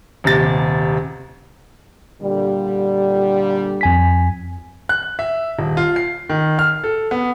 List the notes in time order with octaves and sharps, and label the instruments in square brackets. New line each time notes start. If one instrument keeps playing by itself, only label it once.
[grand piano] D#1 C3 A6
[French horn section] A#2 D3 G3
[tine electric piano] F2 G#5 B6
[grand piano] F#6
E5
D#1
F4
C7
D#3
F6
A4
B3